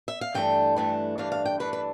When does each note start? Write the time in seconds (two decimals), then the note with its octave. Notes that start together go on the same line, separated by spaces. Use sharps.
0.08 E5
0.21 F5
0.34 G2 E3 A3 D4 G5
0.76 G2 E3 A3 D4
1.18 G2 E3 A3 D4 F5
1.32 F5
1.45 G5
1.60 G2 E3 A3 D4 B4
1.73 B4